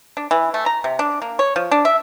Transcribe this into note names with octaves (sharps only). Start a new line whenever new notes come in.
D4
E3
A3
A#5
C3
D4
A#3
C#5
F3
D4
E5